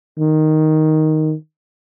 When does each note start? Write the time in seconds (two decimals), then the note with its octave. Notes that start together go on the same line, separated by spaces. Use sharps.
0.19 D#3